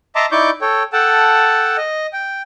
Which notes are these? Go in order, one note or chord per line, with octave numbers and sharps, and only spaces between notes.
D#5 E5 A5 A#5 C6 D6
D#4 E4 D5 C#6 D6 G6
A4 C#5 G5
A4 F#5 G5 A5
D#5
G5